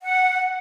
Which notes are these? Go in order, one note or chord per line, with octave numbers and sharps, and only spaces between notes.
F#5